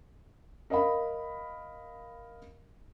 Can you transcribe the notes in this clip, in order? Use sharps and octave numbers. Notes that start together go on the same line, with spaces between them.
A#4 D#5 F5 B5